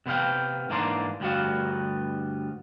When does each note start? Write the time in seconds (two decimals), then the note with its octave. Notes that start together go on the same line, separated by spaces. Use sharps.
0.06 C3 B3 B4 F5 G5
0.69 G#2 E3 A#3 D4 C6
1.20 D2 G2 G3 B3 F#4 F5